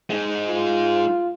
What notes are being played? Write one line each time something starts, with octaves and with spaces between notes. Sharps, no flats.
G#3 D#4
F4